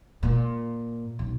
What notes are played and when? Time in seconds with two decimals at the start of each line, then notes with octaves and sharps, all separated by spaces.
0.23 A#2
1.19 B1